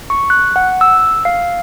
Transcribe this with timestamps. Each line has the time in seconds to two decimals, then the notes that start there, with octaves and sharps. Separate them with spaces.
0.10 C#6
0.30 F#6
0.56 F#5
0.81 E6
1.25 F5